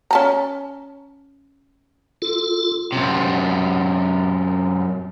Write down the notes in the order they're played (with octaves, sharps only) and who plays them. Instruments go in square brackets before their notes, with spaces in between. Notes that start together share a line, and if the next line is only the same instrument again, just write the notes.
[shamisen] C#4 A5 A#5
[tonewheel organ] F4 A4
[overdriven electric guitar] F#2 C3